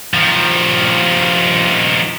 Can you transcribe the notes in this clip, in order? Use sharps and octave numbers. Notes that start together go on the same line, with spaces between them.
D#3 F3